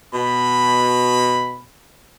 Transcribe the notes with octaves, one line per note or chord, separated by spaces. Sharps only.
B2 B5